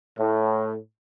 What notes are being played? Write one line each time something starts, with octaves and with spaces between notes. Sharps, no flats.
A2